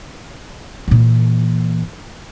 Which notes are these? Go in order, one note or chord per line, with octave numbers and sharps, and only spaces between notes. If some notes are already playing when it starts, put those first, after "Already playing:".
A#2 E3